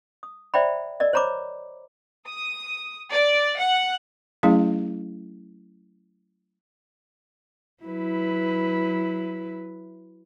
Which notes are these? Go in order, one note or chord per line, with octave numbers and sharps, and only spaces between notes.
D#6
C5 D5 E5 G5 A#5 B5
A#4 D5 D#5
C5 C#5 A#5 B5 D6
D#6
D5
F#5
F#3 A3 C#4 E4 G#4 F5
F#3 E4 B4